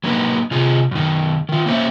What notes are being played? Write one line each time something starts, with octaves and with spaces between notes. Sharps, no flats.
F#3 A#3 D#4 B4
C3 F4 G#4
F#2 D#3
D#3 F4
A#3 C#4 C5 E5